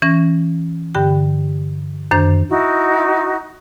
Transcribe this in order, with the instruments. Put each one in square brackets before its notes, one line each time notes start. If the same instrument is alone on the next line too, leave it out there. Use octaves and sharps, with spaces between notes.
[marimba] E3 C#4 A#6
G2 D3 G4 G5
F#2 D#3 D4 C5 G6
[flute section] D#4 E4 F#4